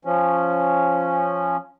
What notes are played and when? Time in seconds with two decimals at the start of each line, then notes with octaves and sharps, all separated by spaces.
0.05 F3 C#4